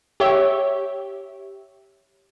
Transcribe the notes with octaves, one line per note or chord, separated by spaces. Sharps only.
G4 C#5 E5